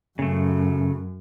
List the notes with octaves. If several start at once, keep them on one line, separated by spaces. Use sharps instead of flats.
F#2 C#3 A3